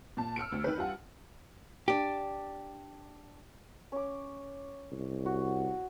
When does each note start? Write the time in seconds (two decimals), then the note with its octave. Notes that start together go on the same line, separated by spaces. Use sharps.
0.17 A#2 A5
0.36 E6 F6 C#7 D7
0.52 D2
0.64 D#3 B4
0.78 G2 F4 F#5 G#5
1.88 D4 G4
3.92 C#4 D6
4.92 C2
5.26 F#4